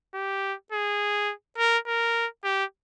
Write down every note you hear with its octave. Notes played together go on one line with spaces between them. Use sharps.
G4
G#4
A#4
A#4
G4